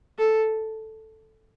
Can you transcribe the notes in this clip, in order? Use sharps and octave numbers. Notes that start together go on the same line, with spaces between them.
A4